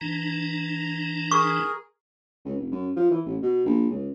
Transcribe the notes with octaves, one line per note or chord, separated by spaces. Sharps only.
E3 D4 D#4 A#5
G#4 A#4 C#6
C#2
F1
F#2
F3
E3
A1
B2
A#1
C#2